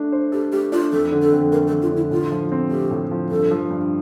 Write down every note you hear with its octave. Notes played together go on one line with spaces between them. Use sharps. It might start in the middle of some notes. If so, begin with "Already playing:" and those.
Already playing: A3 D4
C5
G4 A4
A3 G4
D4 F4
F2 A4
D3
A4
F2
A3 A#4
A4
F2
F4
D3
E4
A2 F4
F3
C4
A3 G4
A2
F3
G2 A4
F3
G2